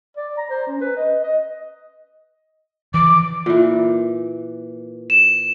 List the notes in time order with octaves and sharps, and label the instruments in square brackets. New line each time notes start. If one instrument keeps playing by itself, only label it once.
[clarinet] D5
A#5
C5
C#4
B4
D#5
D#5
[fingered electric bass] E3 [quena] D6
[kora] A#2 E3
[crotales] E7